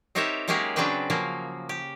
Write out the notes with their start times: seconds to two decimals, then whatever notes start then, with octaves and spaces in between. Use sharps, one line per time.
0.15 C4 D#4 G4 A#4 C#5 E5
0.48 F#3 G#3 A#3 C#4 G4 G#4
0.76 C#3 F#3 C4 D4 B4 G5
1.10 C#3 F3 F#3 A#3
1.69 G4